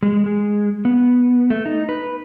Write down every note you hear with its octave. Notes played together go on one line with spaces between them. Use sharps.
G#3
G#3
B3
A3
D#4
B4